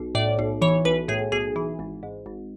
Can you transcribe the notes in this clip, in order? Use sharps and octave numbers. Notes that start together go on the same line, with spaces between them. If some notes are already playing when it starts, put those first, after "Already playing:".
Already playing: B1
A2 D5
B1
E3 C#5
B1 B4
A2 G#4
B1 G#4
E3
G#1
G#2
G#1